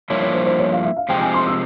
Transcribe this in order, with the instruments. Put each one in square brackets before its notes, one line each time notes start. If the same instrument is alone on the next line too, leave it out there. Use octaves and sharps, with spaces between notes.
[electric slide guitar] G2 F3 A#3 E4 [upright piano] C#5
[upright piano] C#5
C5
C5
C#5
F5
E5
F5
[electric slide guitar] C3 F3 G#3 C4 [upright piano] G5
[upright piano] G#5
C6
E6